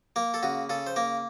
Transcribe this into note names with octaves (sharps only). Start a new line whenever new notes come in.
A#3 A#4
A4
C#3 F#4
C#3 A4
C5
A#3 A#4